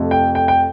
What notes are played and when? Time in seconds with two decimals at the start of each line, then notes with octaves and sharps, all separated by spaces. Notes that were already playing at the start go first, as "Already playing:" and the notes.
Already playing: F2 C3 F3 A3
0.11 G5
0.35 G5
0.48 G5